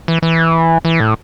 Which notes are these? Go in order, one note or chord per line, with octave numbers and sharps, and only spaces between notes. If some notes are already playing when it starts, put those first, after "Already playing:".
E3
E3
E3
A2